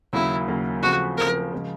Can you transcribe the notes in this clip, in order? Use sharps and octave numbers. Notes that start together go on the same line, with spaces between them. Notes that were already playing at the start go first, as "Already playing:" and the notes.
D#2 C#3 F#3 A#3 E4
D#2 C#3 F#3 A#3
C#3 F3 A3 C4 F#4
C#3 F3 A3 C4 A#4
C#3 F3 G#3